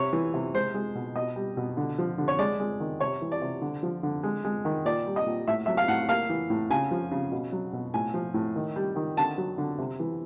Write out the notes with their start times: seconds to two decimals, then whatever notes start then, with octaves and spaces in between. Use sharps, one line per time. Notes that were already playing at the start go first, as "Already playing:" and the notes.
Already playing: C3 C#5
0.13 E3
0.34 C3
0.54 G#3 C5
0.74 G#3
0.95 B2
1.16 B2 D#5
1.36 G3
1.57 B2
1.77 D3
1.98 F3
2.18 D3
2.28 C#5
2.39 G#3 D5
2.60 G#3
2.80 D#3
3.00 C3 C#5
3.22 E3
3.32 D5
3.42 C3
3.62 D3
3.83 F3
4.03 D3
4.23 G#3
4.44 G#3
4.65 D#3
4.85 A#2 D5
5.06 G3
5.16 D#5
5.27 A#2
5.48 A2 E5
5.66 F#3 E5
5.77 F5
5.88 A2 F#5
6.09 A#3 F5
6.29 E3
6.50 A2
6.70 C#3 G#5
6.91 F3
7.11 C#3
7.32 B2
7.52 F#3
7.73 B2
7.94 A2 G#5
8.14 F3
8.34 A2
8.56 D#3
8.76 G3
8.96 D#3
9.17 D3 A5
9.38 F#3
9.58 D3
9.78 C3
10.00 E3